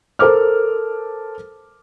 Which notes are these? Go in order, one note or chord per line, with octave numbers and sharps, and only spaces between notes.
A4 A#4 C5 D6 F6